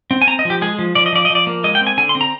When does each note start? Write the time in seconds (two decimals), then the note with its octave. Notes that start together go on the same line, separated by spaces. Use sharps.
0.11 C4
0.22 G#5
0.27 C4 A#5
0.39 D#5
0.45 F3
0.50 G4
0.61 G#3 G#4
0.79 F3
0.95 F3 D5
1.06 D#5
1.13 F3 D5
1.25 D#5
1.30 F3
1.35 D5
1.47 A#3
1.64 G#3 D#5
1.75 G5
1.81 C4
1.87 G#5
1.97 D3 G#5
2.09 C6
2.15 C4
2.21 A#5